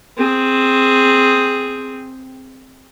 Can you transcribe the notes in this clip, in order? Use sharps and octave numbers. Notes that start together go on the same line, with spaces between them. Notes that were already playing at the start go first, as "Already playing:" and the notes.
C4 G#4